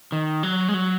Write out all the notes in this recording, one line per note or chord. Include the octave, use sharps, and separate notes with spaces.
D#3
F#3
G#3
F#3